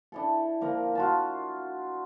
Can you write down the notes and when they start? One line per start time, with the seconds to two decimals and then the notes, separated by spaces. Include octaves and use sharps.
0.12 D4 E4 A4
0.61 F3 A#3 A#4
0.95 F4 F#4 A5